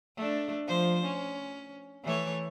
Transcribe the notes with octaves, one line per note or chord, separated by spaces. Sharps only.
A3 D4
F3 C5
C#4
E3 A3 C#5